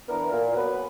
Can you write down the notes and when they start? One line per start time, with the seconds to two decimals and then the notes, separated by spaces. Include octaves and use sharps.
0.08 E3 B3 D4 A#4
0.31 A#2
0.53 F#3 B3 F#4 B4